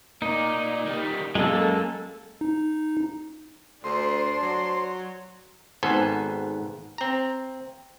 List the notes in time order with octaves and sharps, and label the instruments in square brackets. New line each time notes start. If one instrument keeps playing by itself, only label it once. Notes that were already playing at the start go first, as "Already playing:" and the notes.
[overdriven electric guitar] A#3 D5 [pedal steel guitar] D#4
[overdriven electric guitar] D#3 G3
[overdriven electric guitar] F#2 [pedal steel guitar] G#3 A#3 [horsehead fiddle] A4
[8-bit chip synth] D#4
[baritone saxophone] D2 [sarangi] D4 [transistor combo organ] C5
[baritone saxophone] F#3
[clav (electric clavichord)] G#1 G#2 B3 A4 C5 G#5
C4 A#5